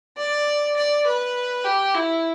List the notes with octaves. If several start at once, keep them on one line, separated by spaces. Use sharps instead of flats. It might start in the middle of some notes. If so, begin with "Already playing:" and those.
D5
D5
B4
G4
E4